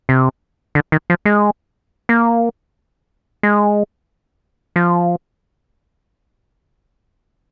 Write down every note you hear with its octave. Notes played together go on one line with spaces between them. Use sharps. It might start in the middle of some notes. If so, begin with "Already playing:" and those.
C3
D3
D#3
F3
G#3
A#3
G#3
F3